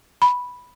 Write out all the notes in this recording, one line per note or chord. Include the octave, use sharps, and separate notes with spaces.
B5